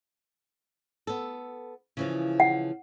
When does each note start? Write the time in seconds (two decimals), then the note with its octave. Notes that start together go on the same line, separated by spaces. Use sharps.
1.07 B3 A4
1.97 C#3 E3 F3
2.40 F#5